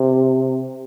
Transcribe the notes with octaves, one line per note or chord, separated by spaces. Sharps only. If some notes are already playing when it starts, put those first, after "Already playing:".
Already playing: C3